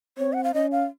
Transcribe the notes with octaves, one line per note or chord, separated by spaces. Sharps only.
C4 C#5
F#5
F5
C#4 D#5
F5